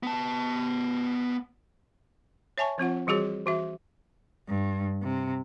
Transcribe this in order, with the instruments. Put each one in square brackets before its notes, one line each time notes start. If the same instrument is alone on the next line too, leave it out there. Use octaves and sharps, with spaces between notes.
[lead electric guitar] B3 A5
[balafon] C#5 E5 G#5 A5 C#6
F3 C4 F4 F#5
E3 G3 F#4 G#4 C#5
E3 F#4 E5
[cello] G2
C3